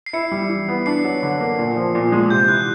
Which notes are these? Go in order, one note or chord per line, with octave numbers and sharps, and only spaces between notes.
C7
E4 C#7
G3
E3
B3
D4 C7
F#3
D3
A#3
A#2
F3
A#2
G#3
C3 G6
E3 F#6